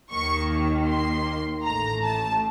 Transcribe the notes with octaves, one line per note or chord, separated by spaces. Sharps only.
D#2 D#3 A#3 C#6
C6
A1 A2 A3 A#5
A5